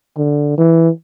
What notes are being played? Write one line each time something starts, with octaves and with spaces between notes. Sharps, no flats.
D3
E3